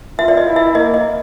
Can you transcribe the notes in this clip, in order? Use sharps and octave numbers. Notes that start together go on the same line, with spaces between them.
F4 E5
D5
D#5
E4
E5
A#3 D#5
D#5